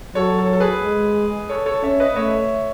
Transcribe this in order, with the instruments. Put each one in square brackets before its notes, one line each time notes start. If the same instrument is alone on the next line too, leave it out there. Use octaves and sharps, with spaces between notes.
[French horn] F#3 [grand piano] A4 C#5
[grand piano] A4
A4
G#4 B4
[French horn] G#3
[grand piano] A4 C#5
A4 C#5
[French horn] C#4 [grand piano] C#5 E5
[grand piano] B4 D#5
[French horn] A3 [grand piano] C#5 E5